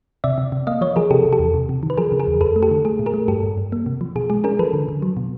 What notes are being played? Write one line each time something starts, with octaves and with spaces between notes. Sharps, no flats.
C3 D5 E5
C3
C3
A#3 D#5 F5
F3 C#5 D#5
F3 G#4 A#4
C3 G4 A4
C3
G4 A4
E2
C3
C3
D#3
B4
F3 G#4 A#4
C#3
G#4 A#4
E2
F2 A4 B4
A3
G4 A4
D3
A3 G#4
A#2
G#4 A#4
A3
G2 G4 A4
G2
G2
A#3
C3
F3
B2 G#4
G#3 G#4
C#4 G#4 A#4
F3 A4 B4
D3
D3
F#3
B2